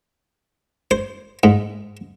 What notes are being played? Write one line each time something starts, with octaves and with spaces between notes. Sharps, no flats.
C5
G#2